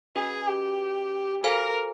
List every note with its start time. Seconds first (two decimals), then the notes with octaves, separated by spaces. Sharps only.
0.16 C#4 F#4 G#4 B4 D#5
0.48 G4
1.44 F#4 A4 A#4 C5 F5 G#5